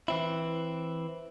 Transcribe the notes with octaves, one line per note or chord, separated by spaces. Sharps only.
E3 C4 E4